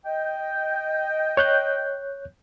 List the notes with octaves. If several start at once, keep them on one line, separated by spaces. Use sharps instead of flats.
D#5 G5
C#5 F#6 G6